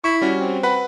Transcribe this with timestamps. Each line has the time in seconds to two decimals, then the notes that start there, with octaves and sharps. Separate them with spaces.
0.04 E4 C#6
0.21 G3 C#4 F#4
0.40 C4
0.63 B4 F#5 B5